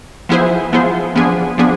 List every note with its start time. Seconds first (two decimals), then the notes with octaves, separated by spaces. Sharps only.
0.29 F3 B3 E4 G#4 C5
0.73 F3 B3 E4 G#4 C5
1.16 F3 B3 D4 G#4
1.58 F3 B3 D4 G#4